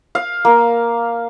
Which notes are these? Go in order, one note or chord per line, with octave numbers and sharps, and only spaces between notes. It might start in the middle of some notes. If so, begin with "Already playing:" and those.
F5
A#3